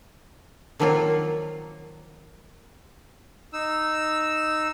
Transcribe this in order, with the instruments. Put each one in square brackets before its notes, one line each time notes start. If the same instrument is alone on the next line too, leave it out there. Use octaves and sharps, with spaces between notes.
[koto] D#3 F3 F#3 A#3 C4 F4
[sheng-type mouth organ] D#4 E6